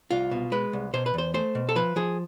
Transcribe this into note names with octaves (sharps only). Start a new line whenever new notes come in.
C2 F4
B2
G#3 B4
C2
B2 C5
B4
E2 C5
A3 C5
B2
A4
F3 B4
F3 G#4